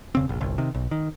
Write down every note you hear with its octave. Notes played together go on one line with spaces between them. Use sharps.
E1 C#3 C4
F1 A#1
G1 C2
C3 D#3
B1
D#3